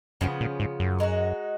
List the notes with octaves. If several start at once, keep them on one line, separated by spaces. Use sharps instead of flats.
F#2 C#3 F3 B3
A#2
G#2
F#2
G#3 D#4 F#4